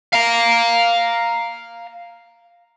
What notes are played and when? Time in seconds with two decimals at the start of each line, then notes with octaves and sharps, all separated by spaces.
0.13 F5 A#5